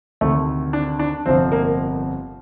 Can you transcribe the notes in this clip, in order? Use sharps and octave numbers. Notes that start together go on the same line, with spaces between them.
D2 C3 D#3 A3
D4
D4
G1 F2 C3 F3 C4
A#3